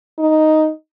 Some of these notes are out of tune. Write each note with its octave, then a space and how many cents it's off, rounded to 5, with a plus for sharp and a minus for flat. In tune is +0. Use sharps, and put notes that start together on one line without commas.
D#4 +0